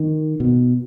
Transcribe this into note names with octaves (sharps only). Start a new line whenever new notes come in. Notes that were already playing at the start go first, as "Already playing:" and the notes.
Already playing: D#3
B2